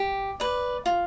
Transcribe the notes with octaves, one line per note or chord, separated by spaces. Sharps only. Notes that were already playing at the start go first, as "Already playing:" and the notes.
Already playing: G4
B4 D5
F4